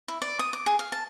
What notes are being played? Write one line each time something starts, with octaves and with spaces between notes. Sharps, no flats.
E4
D5
D#6
D6
G#4
F5
A5